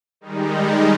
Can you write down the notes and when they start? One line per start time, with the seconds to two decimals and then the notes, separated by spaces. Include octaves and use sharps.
0.21 D#3 G3 G#3 D#4